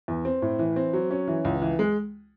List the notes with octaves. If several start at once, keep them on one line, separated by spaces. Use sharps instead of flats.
E2
C4
A2
E3
C4
F#3
C#4
E3
C#2
E3
G#3